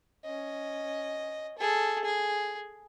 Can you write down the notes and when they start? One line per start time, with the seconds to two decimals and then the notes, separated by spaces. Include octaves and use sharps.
0.25 C#4 D#5
1.58 G#4 A4
2.04 G#4